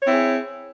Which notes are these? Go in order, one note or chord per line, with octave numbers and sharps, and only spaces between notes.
C4 E4 G#4 C#5